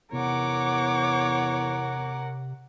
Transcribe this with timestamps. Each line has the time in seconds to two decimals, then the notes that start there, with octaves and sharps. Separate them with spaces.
0.13 E2 C3 A#4 C#5 F#5 D6